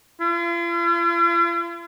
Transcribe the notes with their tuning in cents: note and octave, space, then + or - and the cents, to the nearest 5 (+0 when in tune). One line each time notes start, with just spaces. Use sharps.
F4 -45